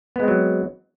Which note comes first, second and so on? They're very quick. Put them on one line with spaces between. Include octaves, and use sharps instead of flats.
B3 G#3 C4 F#3